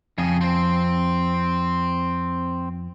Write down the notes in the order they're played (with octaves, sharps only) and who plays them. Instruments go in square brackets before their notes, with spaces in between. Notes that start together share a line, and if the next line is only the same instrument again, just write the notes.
[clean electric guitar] F2 [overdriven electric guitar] C#3 G#4
[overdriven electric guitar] C4 C5